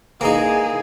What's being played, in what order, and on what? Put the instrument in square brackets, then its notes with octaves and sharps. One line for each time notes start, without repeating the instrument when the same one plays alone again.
[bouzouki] E3 G#3 [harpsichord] A#3 D#4 [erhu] G#4